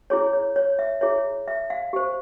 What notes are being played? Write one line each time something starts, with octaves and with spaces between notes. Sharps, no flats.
E4 G#4 C#5
C#5
C#5
E5
E4 G#4 C#5 E5
E5
F5
G4 C5